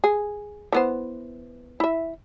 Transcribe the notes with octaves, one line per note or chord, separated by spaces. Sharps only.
G#4
E3 B3 C5
E4 E5